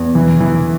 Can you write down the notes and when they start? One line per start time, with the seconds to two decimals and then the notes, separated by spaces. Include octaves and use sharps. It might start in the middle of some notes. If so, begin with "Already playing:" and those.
Already playing: E2
0.15 E3
0.40 E3